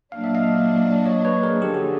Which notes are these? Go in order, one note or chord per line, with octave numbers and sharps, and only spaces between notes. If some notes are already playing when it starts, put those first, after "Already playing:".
A#2 F#3 A#3 D4 F5
E5
D#5 F5
C#5 D#5
B4 C#5
G#4 A#4
F#2 D3 F3 G4 A4
F#4 G#4